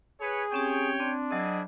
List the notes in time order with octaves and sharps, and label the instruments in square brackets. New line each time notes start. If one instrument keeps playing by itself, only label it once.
[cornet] G#4 [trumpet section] B4 C#5
[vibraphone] C4 C#4 G4 [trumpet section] C#5 G5
[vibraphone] C4 [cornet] D4
[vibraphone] F#3 D#5 [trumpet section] C4 E4 G#4